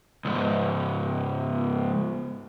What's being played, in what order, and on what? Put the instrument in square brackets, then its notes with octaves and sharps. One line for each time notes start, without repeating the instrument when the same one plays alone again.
[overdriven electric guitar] C#2 G#2